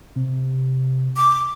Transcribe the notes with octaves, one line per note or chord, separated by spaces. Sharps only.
C3
D6